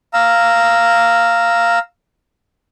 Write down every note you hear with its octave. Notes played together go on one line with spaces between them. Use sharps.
F5 A#5 E6